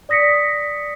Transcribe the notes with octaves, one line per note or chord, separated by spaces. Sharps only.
D5 D#6 A#6 B6 C#7